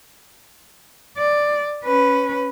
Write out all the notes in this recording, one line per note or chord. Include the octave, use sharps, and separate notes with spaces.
D5
C#4 B4